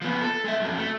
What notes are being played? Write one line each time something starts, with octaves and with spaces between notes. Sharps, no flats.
F3 B3
A4
G#3 E5
F2 F#3
A3